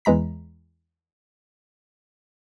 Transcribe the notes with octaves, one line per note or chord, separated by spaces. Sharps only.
E2 E3 G#3 A#5 B6